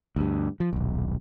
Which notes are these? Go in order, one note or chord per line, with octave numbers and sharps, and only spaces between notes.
D2 G2
F3
D#1 B1